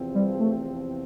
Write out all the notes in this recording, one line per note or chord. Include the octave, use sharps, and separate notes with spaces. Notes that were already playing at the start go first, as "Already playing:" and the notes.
Already playing: E2 C3 F3 C4
G3
A3